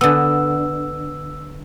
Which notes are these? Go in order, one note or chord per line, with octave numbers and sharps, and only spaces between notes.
D3 B3 E6